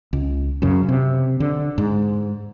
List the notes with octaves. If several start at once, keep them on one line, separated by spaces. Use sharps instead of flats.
C#2
F#2 C#3
C3
D3
G#2